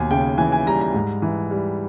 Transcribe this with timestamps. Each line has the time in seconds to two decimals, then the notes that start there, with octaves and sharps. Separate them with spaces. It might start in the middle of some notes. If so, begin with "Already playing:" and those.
Already playing: D#2 B2 G#5
0.10 C#3 G5
0.38 E3 G#5
0.52 G#5
0.66 G3 A#5
0.81 A#5
0.94 G#2
1.22 E3
1.51 G3